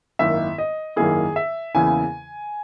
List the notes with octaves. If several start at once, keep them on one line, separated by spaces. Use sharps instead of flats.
G#1 F#2 D#3 A#3 E4 E5
D#5
G#1 F#2 D#3 A#3 E4 G#4
E5
E2 C#3 E3 A#3 E4 G#5